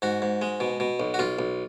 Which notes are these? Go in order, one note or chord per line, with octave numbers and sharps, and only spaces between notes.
G#2 F#4
G#2
G#3
B2
B2
B1
F#4
B1 F4
B1